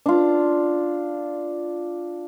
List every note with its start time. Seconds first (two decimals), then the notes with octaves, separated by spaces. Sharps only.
0.06 D4 F4